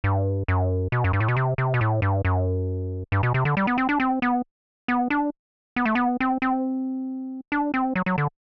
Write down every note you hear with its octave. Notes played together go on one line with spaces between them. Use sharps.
G2
F#2
B2
F#2
G2
A2
B2
C3
C3
B2
A2
G2
F#2
G2
B2
C3
D3
G3
B3
C4
D4
C4
B3
B3
D4
B3
A3
B3
C4
C4
D4
C4
F#3
F#3
D3